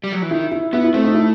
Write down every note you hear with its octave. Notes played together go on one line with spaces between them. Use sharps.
G3
F#3
E3
D#3 E4
E4
B3 E4
E4
A3 C4
D#4
E4